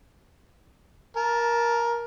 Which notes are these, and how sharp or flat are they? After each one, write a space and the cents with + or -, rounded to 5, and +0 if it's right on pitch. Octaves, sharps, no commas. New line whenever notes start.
A#4 +15 A5 -10